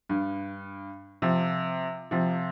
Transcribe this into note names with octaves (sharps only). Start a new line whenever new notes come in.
G2
C3 F3
C3 F3